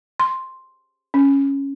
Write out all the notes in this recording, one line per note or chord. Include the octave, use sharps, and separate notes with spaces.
C6
C#4